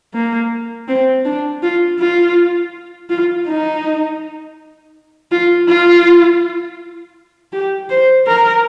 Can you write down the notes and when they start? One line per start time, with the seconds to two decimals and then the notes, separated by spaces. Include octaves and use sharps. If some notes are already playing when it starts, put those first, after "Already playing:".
0.14 A#3
0.88 C4
1.25 D4
1.63 F4
2.00 F4
3.10 F4
3.47 D#4
5.31 F4
5.68 F4
7.53 G4
7.90 C5
8.27 A#4